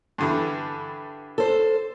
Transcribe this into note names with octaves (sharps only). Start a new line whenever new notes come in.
G2 D3 E3
A4 C5